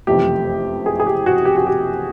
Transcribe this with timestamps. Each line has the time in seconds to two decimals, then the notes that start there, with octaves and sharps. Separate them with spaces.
0.07 F#1 F2 C3 E3 A3 G4
0.86 G#4
1.00 G#4
1.07 G4
1.26 F#4
1.45 G4
1.56 F#4
1.67 G4